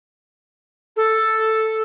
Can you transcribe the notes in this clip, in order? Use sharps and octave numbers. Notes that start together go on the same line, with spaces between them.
A4